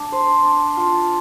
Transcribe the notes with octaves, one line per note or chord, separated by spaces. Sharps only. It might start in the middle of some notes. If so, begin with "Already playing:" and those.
Already playing: D4
C5
D4
F4